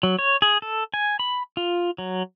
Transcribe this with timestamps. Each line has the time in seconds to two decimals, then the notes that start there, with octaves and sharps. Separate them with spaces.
0.03 F#3
0.19 C#5
0.42 G#4
0.62 A4
0.94 G#5
1.19 B5
1.57 F4
1.98 F#3